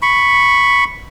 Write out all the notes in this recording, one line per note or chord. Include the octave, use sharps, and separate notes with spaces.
B5 C#6